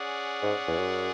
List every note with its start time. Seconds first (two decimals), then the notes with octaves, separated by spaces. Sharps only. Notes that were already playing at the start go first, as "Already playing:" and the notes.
Already playing: C#4 G#4 D5 F#5
0.43 G#2
0.68 E2
0.79 F#2